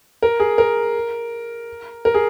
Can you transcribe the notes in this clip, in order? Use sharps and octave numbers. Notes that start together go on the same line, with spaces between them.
A#4
G#4
A#4
A#4
G#4